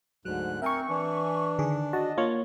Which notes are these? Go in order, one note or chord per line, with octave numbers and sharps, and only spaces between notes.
D2 G#2 F#3 F#6
C4 A#4 E5 G#5 C#6
E3 D4
D3 D#3 G#4
F#4 D#5 A5
A#3 F4 C#5